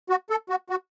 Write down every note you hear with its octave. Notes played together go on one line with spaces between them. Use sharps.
F#4
A4
F#4
F#4